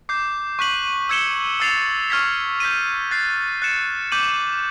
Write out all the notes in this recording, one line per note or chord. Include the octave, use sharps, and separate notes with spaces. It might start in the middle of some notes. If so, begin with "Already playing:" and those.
D6 G6 C7
C#6 F#6 B6 D#7 F#7
E6 G#6 C#7 E7 G7
E6 A6 C7 F7
C#6 F6 G#6 B6
G6 B6 D#7
F#6 A6 C7
F#6 A6 C#7 E7
D6 G6 B6 D#7 F#7